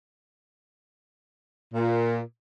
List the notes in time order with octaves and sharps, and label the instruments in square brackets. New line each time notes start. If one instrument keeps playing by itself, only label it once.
[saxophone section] A#2